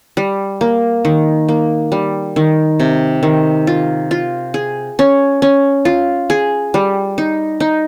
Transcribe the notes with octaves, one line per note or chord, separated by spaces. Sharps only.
G3
A#3
D#3
A#3
G3
D#3
C3
D#3
F4
F4
G#4
C#4
C#4
F4
G#4
G3
D#4
D#4